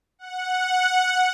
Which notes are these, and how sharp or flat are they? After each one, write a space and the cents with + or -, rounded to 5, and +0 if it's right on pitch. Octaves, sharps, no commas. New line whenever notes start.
F#5 -5